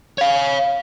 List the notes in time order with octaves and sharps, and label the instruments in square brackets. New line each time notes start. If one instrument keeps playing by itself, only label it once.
[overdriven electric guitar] C#5 F5